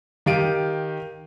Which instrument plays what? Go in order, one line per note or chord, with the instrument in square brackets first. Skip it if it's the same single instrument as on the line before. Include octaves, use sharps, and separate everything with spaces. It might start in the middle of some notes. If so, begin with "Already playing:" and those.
[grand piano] D#3 G4 F5 D7 D#7